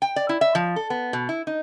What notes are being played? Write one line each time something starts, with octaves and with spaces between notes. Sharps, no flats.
G5
D5
E4
E5
F3
A4
B3
B2
E4
D#4